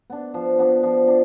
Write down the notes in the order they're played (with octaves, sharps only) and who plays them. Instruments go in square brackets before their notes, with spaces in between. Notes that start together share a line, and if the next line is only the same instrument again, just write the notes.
[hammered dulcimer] B3 D4
F3
B3 D4
F3
D4